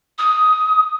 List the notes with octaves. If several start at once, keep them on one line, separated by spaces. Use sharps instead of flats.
D#6